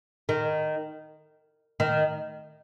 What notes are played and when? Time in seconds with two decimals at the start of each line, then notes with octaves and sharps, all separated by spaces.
0.29 D#3
1.80 D#3